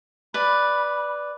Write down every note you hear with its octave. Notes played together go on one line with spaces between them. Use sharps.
B4 D5 B5